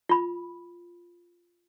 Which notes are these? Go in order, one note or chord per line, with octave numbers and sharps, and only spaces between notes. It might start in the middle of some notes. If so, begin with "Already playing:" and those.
F4 B5